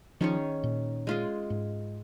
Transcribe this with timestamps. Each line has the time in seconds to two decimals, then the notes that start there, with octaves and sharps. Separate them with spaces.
0.21 D#3 F3 C#4 G#4 C#5
0.63 A#2
1.07 G#3 F4 G#4
1.50 G#2